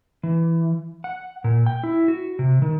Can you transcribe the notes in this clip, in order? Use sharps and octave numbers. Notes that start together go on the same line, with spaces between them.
E3
F#5
A#2
G5
E4
F#4
C3
D#3